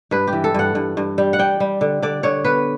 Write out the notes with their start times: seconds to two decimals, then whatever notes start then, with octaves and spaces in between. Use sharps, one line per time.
0.11 G2 B4
0.27 G4
0.33 E3
0.44 A4
0.54 G2 F#5
0.75 G2
0.97 G2
1.18 G3
1.33 F#5
1.39 G3 G5
1.60 G3
1.81 D3
2.02 D3 D5
2.23 D3 C#5
2.44 B3 B4